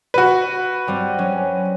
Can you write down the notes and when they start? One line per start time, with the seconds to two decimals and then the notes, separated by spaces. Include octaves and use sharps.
0.14 F#4 B4
0.87 G2 G3 C4
1.18 F#3 C#4